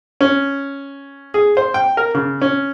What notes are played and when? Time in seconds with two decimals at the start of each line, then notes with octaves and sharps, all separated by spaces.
0.21 C#4
1.34 G#4
1.57 C5
1.74 G5
1.97 A#4
2.14 C#3
2.42 C#4